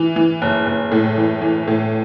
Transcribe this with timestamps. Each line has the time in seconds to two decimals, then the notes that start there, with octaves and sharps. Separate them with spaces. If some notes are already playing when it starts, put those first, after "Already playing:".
Already playing: E3
0.16 E3
0.42 F#1
0.67 F#1
0.92 A2
1.18 E3
1.42 E3
1.68 A2